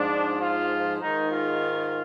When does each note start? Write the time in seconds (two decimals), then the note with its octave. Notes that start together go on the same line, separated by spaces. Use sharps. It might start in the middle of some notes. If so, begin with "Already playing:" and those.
Already playing: G#2 F3 D4
0.41 F4
1.01 G#2 D#3 D#4
1.31 F4